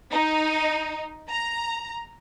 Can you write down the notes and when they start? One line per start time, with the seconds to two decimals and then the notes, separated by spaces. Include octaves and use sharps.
0.12 D#4
1.29 A#5